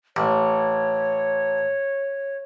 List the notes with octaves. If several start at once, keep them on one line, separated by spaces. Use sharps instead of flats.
A1 C#5